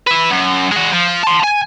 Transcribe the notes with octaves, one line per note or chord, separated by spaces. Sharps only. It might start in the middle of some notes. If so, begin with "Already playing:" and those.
B4 E5
F#2
G#3 F#4
F3
A5 C6
G#5